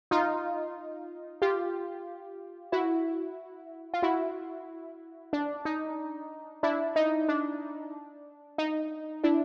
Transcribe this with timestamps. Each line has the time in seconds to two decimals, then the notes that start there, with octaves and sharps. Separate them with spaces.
0.11 D#4 F4
1.42 F4 G4
2.72 E4 F#4
3.94 F4
4.03 E4 F#4
5.33 D4
5.65 D#4
6.63 D4 E4
6.96 D#4
7.29 D4
8.58 D#4
9.24 D4 E4